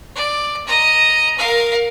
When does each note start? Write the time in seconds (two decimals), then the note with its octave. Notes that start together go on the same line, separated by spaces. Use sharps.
0.15 D5
0.67 D#5 A#5
1.38 A#4 F5